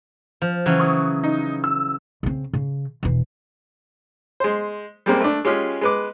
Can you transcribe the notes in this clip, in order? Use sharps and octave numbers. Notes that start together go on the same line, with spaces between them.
F3
C#3 E3 F#3
C#6 D#6
D#4
E6
C#3 C4
C#3
E1 E3
G#3 C5
G3 G#3 A#3 C4
A3 D4
G#3 C#4 F4 G4 G#4
G#3 B4 D6